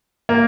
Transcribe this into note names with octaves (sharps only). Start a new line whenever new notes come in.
A#3